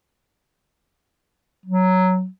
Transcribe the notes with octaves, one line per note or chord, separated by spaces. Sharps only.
F#3